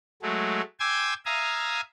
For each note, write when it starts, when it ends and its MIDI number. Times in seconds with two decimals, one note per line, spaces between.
0.22 0.61 54
0.22 0.61 56
0.22 0.61 57
0.80 1.14 79
0.80 1.14 80
0.80 1.14 84
0.80 1.14 86
0.80 1.14 88
0.80 1.14 92
1.26 1.81 76
1.26 1.81 77
1.26 1.81 80
1.26 1.81 82
1.26 1.81 87